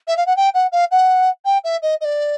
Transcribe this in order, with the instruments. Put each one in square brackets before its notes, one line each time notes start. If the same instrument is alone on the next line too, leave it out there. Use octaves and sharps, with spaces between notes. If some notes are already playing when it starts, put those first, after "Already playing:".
[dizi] E5
F5
F#5
G5
F#5
F5
F#5
G5
E5
D#5
D#5
D5